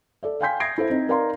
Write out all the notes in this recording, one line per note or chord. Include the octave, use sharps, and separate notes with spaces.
A4 D5 E5
F5 G5 G#5 C6 G6 B6
E5 D#6 G#6 A#6 C7 D7
E4 A4 C5 E5
C4 D#4
D#4 A#4 D5 F5 A#5 C6